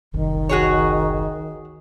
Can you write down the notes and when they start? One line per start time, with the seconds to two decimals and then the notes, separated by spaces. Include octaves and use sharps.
0.14 F#1 C2 D#3
0.49 F#4 G#4 C#5